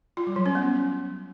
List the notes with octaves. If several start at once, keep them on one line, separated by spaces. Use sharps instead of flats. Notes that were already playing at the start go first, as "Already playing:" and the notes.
F4
G3
F#3
C#4
B3